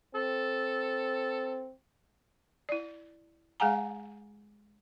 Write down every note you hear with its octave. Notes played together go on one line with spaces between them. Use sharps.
C4 A4
E4 D5
G#3 G#4 F5 F#5 G#5 A#5